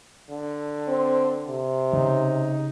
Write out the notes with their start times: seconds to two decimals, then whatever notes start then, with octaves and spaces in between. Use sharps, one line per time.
0.30 D3
0.88 C4
1.47 C3
1.93 C#3 D#4